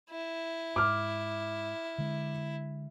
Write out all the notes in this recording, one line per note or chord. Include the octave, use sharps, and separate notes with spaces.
E4
G#2 D6 F6
D3 G#3